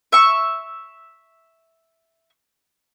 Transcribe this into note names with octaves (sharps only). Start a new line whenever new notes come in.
E5 C#6